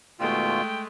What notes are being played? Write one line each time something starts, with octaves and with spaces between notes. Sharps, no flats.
D#2 B2 G#3 A3 F4 G5